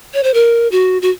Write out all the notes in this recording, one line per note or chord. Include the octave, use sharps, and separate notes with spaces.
C#5
C5
A#4
F#4
F#4